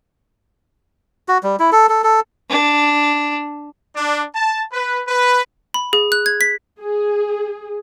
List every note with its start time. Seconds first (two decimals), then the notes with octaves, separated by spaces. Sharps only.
1.28 F#4
1.43 G3
1.59 E4
1.72 A4
1.89 A4
2.04 A4
2.50 D4
3.96 D4
4.35 A5
4.73 B4
5.07 B4
5.74 B5
5.93 G#4
6.12 F#6
6.26 G#6
6.41 B6
6.81 G#4